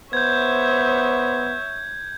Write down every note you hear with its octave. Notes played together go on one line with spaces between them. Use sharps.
B3 C5 C#5 E5 G6 G#6